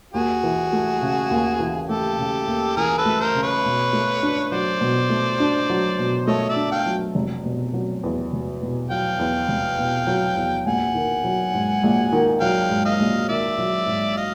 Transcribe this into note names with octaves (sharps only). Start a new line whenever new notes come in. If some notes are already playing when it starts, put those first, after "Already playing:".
D#2 F#4 G#4
E3
A3
C#3
D#2
E3
A3 G4 A4
C#3
D#2
E3 G#4 A#4
A4 B4
A3
A#4 C5
C#3
B4 C#5
B2
A3
D4
F#3 C5 D5
B2
A3
D4
F#3
B2
A3 C#5 D#5
D5 E5
D4
F5 G5
F#3
F1
B2
F#3
E2
F1
B2
F#3 F5 G5
E2
F1
B2
F#3
E2
A#1 F#5 G#5
D#3
F#3
G#2
A#1
D#3
F#3 F5 G5
G#2
D#5 F5
A#1
D#3 D5 E5
F#3
G#2
D#5 F5